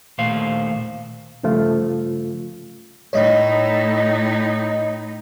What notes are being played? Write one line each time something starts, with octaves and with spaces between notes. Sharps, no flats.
D#2 A#2 A3 C5 F5
G2 C#3 F3 A3 F4
A2 D#4 C#5 D#5